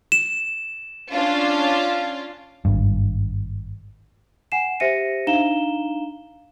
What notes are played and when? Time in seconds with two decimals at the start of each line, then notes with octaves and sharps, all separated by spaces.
0.12 E7
1.11 C#4 D4 F4
2.65 G#1 G2
4.52 F#5 G#5 C7 E7
4.80 G4 C5 E5 A#6 C#7 D#7
5.27 D4 D#4 F5 A#5 E7 G7